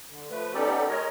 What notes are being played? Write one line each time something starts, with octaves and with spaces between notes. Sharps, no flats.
D3
F3 A3 B4
B3 C#4 D#4 G4 A4 D5
G#3 A#4 C#5 D#5